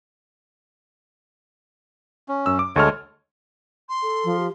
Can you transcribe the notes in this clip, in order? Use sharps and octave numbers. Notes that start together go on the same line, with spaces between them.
C#4
F#2 E6
D6
D2 G#3 A4 C#5 F6
C6
A4
F3
G4